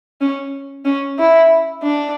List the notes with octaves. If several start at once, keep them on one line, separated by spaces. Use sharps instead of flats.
C#4
C#4
E4
D4